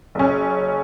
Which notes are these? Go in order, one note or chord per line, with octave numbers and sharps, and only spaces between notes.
F#1 C#4